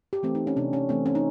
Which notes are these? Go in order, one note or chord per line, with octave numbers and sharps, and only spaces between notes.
G4
E3 A3 C4
D#4
C#4
C3 D4
C#4
E3 A3 C4
C#4
D#4